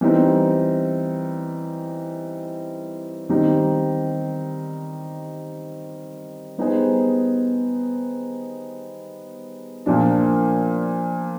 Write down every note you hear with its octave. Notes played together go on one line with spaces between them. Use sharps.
E3 G3 C4 D#4
D#3 G3 C4 D#4 G4
G3 B3 D#4 G#4 C5
A#2 F3 A#3 D4